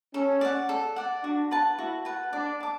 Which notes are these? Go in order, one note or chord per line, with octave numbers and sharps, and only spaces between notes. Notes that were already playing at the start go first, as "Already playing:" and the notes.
C#4 A4
D5 F#5
A4
D5 F#5
D4 F#4
B4 F#5 A5
E4 F#4
B4 F#5 A5
D4 D5
A5 D6